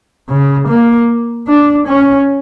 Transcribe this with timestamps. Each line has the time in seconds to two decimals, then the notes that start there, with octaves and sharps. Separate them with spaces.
0.29 C#3
0.68 A#3
1.47 D4
1.87 C#4